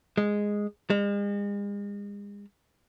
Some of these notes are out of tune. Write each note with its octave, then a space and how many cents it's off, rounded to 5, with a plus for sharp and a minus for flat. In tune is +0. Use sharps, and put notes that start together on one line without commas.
G#3 -5
G#3 -40